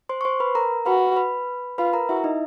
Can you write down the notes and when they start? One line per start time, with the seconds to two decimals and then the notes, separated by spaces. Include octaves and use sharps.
0.09 C5 C6
0.21 C#6
0.25 C5 C6
0.40 B4 B5
0.55 A#4 A#5
0.86 F#4 B4 B5
1.16 B4 B5
1.78 F4 B4 B5
1.93 A#4 A#5
2.09 E4 F#4 E5
2.24 D#4 D#5